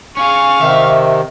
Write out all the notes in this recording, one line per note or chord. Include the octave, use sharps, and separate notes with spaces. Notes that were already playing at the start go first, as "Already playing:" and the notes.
C#4 G#4 F5 C#6
C3 D#3 E5